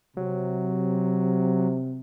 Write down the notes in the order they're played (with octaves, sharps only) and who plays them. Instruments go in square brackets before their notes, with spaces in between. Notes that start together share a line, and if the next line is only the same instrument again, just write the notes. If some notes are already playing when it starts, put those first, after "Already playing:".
[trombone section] C3 [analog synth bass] F#3